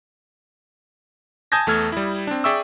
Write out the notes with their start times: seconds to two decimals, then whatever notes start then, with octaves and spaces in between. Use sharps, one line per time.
1.52 G#5 A5 D#6 G6 G#6 A#6
1.67 E2 A3 A4 F6 G#6
1.92 G3 E4
2.27 C4 D4
2.44 G#4 D5 E5 G5 C#6 E6